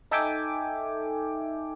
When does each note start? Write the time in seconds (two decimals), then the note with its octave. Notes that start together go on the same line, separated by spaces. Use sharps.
0.11 D#4 A4 E5 G5 G#5 D6